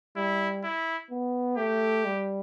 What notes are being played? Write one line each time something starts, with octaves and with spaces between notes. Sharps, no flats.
G3 E4
E4
B3
A3 G4
G3